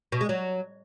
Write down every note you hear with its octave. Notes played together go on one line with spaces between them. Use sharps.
B2
G#3
F#3